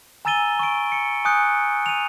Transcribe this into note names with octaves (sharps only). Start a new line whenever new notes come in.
G#5 A#5 E6 A6 D#7 G7
C#6 D7
C#7
G#5 D#6 F#6 G6 C#7
D#7 F7